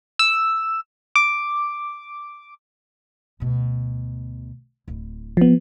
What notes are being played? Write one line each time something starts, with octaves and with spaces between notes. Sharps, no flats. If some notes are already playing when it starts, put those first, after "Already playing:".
E6
D6
D2 B2
D1 E4
F3 B3